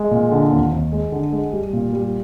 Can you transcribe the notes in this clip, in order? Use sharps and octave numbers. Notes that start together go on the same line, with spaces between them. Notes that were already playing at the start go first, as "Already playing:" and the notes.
Already playing: G#3
A#2
D3
D#2
D#2
G#3
D3
G#3
G3
A#2
G3